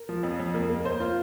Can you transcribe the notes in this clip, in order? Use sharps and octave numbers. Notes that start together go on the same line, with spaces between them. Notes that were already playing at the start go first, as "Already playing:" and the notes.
Already playing: A#4
F3
F2
F2
A#3
A#3
C5
F4